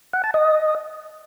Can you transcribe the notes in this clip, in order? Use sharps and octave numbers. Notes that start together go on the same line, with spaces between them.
F#5
A5
D#5